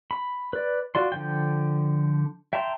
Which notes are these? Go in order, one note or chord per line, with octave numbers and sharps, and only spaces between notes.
B5
B4 D5
F4 F#4 D5 C6
D3 F3 G5
E5 G5 A5 A#5 C6